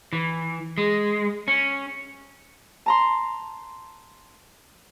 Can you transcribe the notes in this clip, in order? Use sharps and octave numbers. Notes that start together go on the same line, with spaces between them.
E3
G#3
C#4
A5 A#5 C6